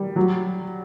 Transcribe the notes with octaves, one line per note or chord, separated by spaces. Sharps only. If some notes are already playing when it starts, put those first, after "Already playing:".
Already playing: G3
F#3